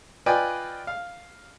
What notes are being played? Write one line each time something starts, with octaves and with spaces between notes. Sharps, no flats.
F4 B4 D5 D#5 G5 G#5
F5